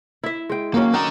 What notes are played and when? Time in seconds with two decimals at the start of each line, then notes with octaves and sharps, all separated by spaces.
0.24 E4 E5
0.49 G#3 G5
0.74 D#3 F#3 A#3 C#4
0.94 D4 D#4 F#5